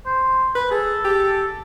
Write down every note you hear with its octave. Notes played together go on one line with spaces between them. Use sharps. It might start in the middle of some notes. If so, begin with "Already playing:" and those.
C5
B4 B5
G#4 A4
G4